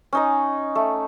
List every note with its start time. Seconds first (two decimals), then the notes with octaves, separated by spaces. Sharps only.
0.13 C#4 D#4 D#5
0.75 A3